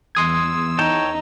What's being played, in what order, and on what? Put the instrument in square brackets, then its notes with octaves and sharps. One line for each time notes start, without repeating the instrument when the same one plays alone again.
[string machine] E2 E6 [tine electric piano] C6 D#6 G#6
[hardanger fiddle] D#4 [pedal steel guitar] C#5 G5 A5